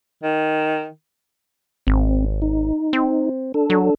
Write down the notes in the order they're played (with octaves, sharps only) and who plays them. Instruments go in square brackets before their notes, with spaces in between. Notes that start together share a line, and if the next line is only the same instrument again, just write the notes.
[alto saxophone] D#3
[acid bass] G#1 [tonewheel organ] C4
[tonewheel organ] D#4
[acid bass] C4
[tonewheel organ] D4 A4
[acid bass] F#3